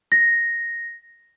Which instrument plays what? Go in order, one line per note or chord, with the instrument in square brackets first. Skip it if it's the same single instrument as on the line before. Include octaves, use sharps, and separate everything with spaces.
[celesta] A#6